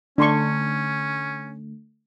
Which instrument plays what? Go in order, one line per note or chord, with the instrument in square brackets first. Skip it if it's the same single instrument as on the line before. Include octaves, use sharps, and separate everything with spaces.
[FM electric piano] D3 A3 [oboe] C#4 [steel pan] D4 C6 C#6